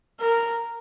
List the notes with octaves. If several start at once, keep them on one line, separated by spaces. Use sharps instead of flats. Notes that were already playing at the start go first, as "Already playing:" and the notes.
A#4